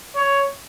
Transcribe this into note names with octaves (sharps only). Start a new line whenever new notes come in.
C#5